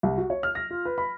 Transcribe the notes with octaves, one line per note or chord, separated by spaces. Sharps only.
C2
F#4
C#5
F6
A#6
F4
B4
B5